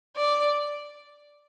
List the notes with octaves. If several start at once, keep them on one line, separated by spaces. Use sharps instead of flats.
D5